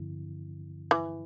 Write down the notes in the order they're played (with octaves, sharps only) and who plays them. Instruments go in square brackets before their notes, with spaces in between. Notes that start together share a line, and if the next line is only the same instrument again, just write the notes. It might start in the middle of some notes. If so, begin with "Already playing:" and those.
Already playing: [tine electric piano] G2 D3 F3 C4 E4
[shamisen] E3